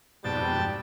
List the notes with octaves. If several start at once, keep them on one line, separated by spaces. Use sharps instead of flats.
F2 G#2 B2 G3 G5 A5 A6